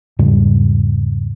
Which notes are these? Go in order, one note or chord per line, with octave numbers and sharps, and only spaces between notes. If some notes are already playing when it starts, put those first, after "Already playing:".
E2 G#2 C#3 G3